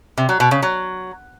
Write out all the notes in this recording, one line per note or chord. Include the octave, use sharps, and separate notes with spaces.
C3
F#3
B2
C#3
F#3